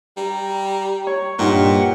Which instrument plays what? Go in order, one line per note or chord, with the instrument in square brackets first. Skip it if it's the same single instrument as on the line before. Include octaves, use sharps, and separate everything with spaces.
[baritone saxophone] G3 [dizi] A#5
[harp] C#5
[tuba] G2 [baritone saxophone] A#2 [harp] D#4 G5 [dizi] F#5